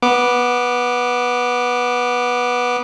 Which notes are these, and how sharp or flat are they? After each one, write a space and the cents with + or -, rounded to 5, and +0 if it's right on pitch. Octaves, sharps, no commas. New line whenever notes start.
B3 -10 D6 +0